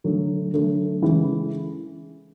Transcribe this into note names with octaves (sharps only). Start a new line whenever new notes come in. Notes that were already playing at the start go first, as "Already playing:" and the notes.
D3 F#3 A3
D3 F#3 A3
C#3 E3 G#3